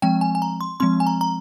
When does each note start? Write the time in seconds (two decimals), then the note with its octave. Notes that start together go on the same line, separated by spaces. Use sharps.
0.02 F3 G#3 C4 G5
0.21 G#5
0.35 G#5
0.42 A#5
0.61 C6
0.80 F3 G#3 C4 C6
1.00 G#5
1.07 A#5
1.21 A#5